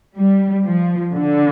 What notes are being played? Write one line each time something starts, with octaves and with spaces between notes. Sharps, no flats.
G3
F3
D3